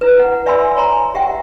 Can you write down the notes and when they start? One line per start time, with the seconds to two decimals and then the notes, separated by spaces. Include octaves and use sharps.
0.01 E4 B4
0.19 F#5
0.46 D5 E5 G#5 B5 C6 E6
0.76 C#5 G#5 A#5 C6
1.14 G4 E5 F#5 G5